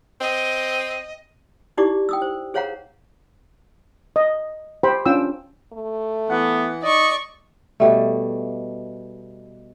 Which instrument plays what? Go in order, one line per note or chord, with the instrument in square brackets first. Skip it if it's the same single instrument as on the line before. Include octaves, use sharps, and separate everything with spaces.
[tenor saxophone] C4 [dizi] D#5
[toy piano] D#4 E4 G4 D5 D6
G5 D#6 E6
C5
G#4 C5 C#5 F5 F#5 A#5
[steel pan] D#5
G4 C5 G5 B5
C#4 D4 F4 G5 E6
[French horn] A3
[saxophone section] E3 F#5 [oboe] B3
[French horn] D#4 [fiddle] D5 C#6 [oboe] D#5
[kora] B2 G3 A3